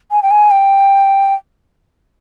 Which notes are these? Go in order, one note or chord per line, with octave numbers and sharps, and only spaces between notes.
G#5
G5
G#5
G5